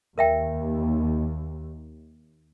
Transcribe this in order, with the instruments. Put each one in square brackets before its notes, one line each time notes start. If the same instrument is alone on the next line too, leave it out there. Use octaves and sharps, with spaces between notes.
[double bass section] D#2 [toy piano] A#4 E5 G5